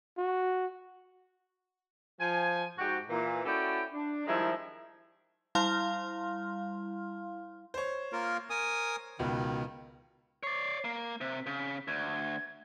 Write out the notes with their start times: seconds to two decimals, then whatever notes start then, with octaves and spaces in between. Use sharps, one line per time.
0.17 F#4
2.20 F3 G#5
2.78 G#2 F#4 G4
3.10 A#2 E3
3.45 C#4 E4 F#4 A4 D5 G5
3.93 D4
4.27 D#3 F3 G3 G#3 E4
5.55 G3 E4 F5 C6 F6
7.74 C5 C#5
8.13 A#3 F4 A#4
8.50 A#4 G#5 D#6
9.19 C#2 B2 D#3
10.43 C#5 D5 C7
10.85 A#3
11.21 C3 B6
11.46 C#3 B6
11.88 D2 G#6